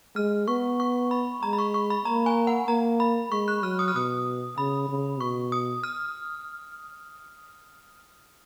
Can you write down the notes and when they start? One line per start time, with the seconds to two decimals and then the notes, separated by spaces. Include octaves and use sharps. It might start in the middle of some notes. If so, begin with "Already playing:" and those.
0.16 G#3 F6
0.48 B3 C#6
0.80 C#6
1.11 B5
1.43 G#3 A#5
1.53 B5
1.58 C#6
1.74 C#6
1.90 B5
2.05 A#3 A#5
2.26 G#5
2.47 F#5
2.68 A#3 A#5
3.00 B5
3.32 G#3 C#6
3.48 F#6
3.63 F#3 F6
3.79 D#6
3.88 F6
3.94 B2 D#6
4.58 C#3 B5
4.89 C#3
5.20 B2 C#6
5.52 D#6
5.83 F6